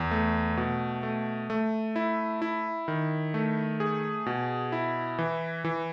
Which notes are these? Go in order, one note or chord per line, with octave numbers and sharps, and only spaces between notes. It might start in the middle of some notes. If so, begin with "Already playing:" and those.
Already playing: E2
A3
B2
A3
A3
E4
E4
D#3
A3
G#4
B2
E4
E3
E3